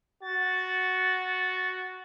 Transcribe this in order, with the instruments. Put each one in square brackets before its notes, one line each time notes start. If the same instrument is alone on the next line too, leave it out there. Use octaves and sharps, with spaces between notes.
[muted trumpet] F#4 [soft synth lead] A6